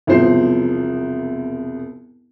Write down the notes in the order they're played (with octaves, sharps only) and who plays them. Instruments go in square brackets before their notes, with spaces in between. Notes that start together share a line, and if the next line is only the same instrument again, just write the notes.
[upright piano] E1 C2 B2 F3 C5 C7